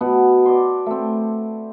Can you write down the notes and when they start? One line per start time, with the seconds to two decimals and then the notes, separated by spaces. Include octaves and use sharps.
0.01 B2 B3 F#5 A5
0.46 D5 C6
0.86 A3 C4